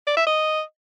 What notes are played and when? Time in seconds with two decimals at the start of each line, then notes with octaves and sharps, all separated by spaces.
0.07 D5
0.17 E5
0.27 D#5